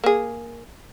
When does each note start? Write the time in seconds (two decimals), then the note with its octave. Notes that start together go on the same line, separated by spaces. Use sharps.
0.04 A#3 G#4